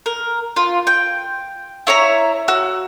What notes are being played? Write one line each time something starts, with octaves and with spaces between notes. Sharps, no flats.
A#4
F4
G5
E4 C#5 E5 A#5
F#4 E6